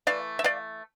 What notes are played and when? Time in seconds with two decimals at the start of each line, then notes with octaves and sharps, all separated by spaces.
0.07 E3 A3 D5 F5
0.39 E5
0.44 D5 F5